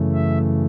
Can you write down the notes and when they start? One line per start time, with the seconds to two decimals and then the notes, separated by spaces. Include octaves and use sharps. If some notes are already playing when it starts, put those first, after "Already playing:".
Already playing: F#2 C#3 E3 A3
0.14 E5